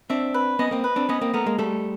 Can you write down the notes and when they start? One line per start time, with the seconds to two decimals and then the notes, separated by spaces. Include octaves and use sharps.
0.09 C4 D4 E5
0.34 B4
0.59 B3 C#4 D#5
0.71 A#3 C4
0.84 B4
0.96 C4 D4
1.09 B3 C#4 D#5
1.21 A#3 C4
1.34 A3 B3 A#4
1.46 G#3 A#3
1.58 G3 A3 A4